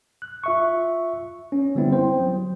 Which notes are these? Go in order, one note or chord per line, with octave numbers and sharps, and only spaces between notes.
F#6
F4 E5 C#6
C#4
D3 G3 B3 C4 E4
C5 G5
F#3